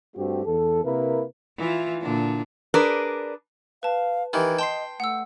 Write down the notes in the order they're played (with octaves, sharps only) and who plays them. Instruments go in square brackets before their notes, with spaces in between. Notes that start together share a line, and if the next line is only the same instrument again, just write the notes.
[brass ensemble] G2 A3 C4 F#4 G4
E2 A4
C3 A#3 E4 A#4 B4
[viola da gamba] E3 E4 F4
A#2 D3 D4
[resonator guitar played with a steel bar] D4 G#4 A#4 B4 D5
[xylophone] B4 A5 [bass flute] F5
[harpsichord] D#3 E3 [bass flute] G4
[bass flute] D#5 [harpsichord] G5 [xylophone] A5 C6 C7
[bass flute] A3 [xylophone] F#5 E6